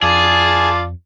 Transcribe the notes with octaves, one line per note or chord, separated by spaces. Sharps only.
F2 F4 G#4 D5 A5